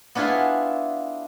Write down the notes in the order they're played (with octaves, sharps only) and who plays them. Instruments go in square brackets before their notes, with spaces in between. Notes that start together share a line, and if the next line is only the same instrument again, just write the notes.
[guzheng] B3 D4 E4 F4 G#4